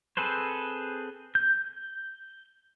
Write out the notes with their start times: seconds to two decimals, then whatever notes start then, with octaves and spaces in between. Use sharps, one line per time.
0.17 C4 G#4 A4 B4 C5
1.35 G6